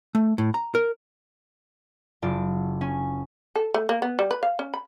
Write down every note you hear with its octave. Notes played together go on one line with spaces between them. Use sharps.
A3
A2
A#5
A#4
F#1 F4 D5
C#4 G#5
A4
A3
A#3
B3
G3
B4
F5
C#4
B5